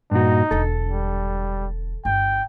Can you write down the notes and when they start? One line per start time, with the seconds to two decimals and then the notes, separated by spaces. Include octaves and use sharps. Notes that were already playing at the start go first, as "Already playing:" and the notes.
0.11 G2 A#2 D#4 F#4
0.51 E1 D3 A4
0.88 G3
2.05 G1 G5